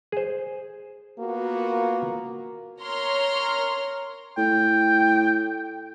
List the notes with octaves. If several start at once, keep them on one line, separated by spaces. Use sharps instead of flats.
G#4 C5
A#3 B3 F4 F#4
A#4 C#5 A#5 C6 F6
A2 G5